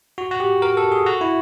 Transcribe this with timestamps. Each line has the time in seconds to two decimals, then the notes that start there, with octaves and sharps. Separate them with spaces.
0.18 F#4
0.31 F#4
0.40 G4
0.62 A#4
0.77 A4
0.92 G#4
1.06 F#4
1.21 E4